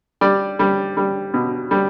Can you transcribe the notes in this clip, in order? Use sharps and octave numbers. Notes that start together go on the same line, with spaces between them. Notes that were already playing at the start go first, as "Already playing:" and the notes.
G3 D5
G3
G3
B2
G3